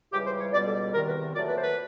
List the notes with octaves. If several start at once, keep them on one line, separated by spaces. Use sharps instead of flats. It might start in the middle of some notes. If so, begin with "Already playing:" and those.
C#2 C#3 E3 G3 G4
C5
C#5
C#2 B2 G3 D5
A4
E2 C3 D#3 A#4
B4
A#2 F#3 A3 D5
B4
C5
B4